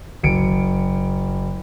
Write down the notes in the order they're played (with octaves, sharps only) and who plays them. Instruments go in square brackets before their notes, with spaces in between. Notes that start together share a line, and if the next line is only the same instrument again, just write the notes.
[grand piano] F#1 C#7 D7